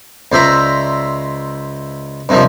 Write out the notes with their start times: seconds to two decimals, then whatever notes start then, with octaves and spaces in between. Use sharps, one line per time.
0.32 C#2 C5 D5 E5 A#5
2.29 G2 C3 D#3 F3